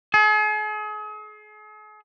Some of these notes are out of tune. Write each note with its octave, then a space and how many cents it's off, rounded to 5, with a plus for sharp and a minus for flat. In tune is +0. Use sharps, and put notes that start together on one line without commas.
G#4 +40